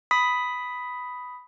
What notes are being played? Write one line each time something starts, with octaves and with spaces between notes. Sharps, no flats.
B5 D#6 B6